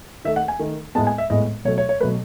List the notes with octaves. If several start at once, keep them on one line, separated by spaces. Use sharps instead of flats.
D#3 A3 E5
F#5
G#5
D#3 A3
A2 G#3 B3 A5
G#5
E5
A2 G#3 B3 D#5
B2 F#3 A3 C#5
C#5
C#5
B2 F#3 A3 B4